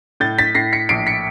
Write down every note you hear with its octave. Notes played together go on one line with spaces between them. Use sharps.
A2 G6 A6
A6 B6
A2 A#6 C7
B6 C#7
A#1 C7 D7
B6 C#7